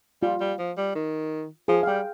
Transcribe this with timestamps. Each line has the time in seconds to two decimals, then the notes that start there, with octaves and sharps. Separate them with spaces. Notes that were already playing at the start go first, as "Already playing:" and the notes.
0.22 G3 F4
0.40 G3
0.59 F3
0.77 G3
0.95 D#3
1.68 F3 G#4
1.83 F5
1.87 G3 G5